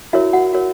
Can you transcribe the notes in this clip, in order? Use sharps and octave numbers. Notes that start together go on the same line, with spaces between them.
E4 F#4 A#4 C#5 E5
F#4 F#5
F#4 A#4 C#5